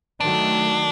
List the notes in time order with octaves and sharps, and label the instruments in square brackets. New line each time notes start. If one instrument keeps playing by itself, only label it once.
[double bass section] D#3 F#3 A3 [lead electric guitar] D4